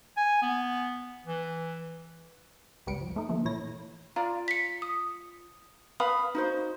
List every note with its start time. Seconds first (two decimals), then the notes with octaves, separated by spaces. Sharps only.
0.17 G#5
0.42 B3
1.26 E3
2.87 G1 C#2 G3 B4 C#7 D7
3.01 F3
3.16 A3 D#4
3.29 D3 E3 F3 A3 A#3
3.45 A#2 E3 E4 C#5 A#6
4.16 F4 D5 F5 A#5
4.48 B6 C#7
4.82 D#6
6.00 B4 F5 B5 D#6
6.35 D#4 F#4 C5